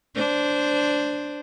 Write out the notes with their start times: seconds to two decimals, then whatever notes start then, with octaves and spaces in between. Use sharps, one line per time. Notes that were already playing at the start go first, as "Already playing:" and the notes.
0.15 D4 C5